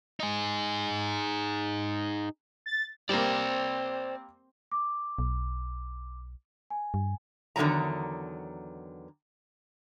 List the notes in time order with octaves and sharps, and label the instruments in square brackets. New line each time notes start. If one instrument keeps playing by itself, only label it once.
[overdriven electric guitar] D#4 G#4
[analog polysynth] A6
[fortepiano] G3 A#3 [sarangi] C4 [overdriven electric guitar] C5 D5
[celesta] D6
[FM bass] B1
[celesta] G#5
[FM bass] G2
[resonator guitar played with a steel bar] E2 D3 D#3 F#3 G3 A#5